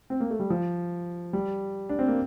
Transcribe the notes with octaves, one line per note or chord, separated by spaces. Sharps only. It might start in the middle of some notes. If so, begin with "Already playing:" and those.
C4
A#3
A3
G3
F3
G3
D4
C4
A#3